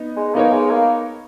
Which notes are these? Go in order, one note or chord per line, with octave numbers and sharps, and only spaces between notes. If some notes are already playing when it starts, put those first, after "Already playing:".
Already playing: B3 D#4
G#3
A#3 B3 D#4 A#4 C#5
G#3
A#3